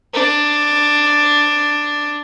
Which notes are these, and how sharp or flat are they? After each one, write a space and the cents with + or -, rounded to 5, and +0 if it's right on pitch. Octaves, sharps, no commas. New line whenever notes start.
D4 +5